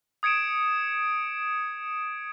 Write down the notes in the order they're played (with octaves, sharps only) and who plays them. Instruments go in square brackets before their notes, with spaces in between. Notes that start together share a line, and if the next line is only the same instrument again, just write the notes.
[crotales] D#6 G#6 C#7 D7 E7